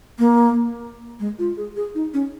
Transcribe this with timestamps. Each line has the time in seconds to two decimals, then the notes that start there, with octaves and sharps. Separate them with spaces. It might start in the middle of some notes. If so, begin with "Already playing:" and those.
0.19 A#3
1.20 G#3
1.39 F4
1.57 G#4
1.76 G#4
1.95 D#4
2.14 C#4